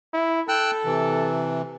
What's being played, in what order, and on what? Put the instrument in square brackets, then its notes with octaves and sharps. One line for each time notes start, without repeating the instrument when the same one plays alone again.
[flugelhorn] E4
[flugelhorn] A4 [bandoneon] G5 E6 F#6
[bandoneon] C3 E3